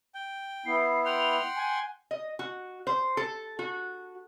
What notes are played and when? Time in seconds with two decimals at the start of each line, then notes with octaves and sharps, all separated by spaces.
0.15 G5
0.66 B3 E4 C7
1.05 F#5 G5 C6 F7
1.56 G#5
2.11 D#5
2.39 F#4
2.87 C5
3.17 A4
3.59 F#4